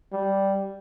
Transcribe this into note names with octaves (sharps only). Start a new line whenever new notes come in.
G3